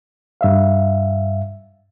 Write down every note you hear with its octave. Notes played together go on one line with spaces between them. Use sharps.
G2 E5 F5